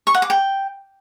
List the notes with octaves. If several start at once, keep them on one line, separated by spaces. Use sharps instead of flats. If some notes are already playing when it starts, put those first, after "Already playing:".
C#6
F#5
D6
G5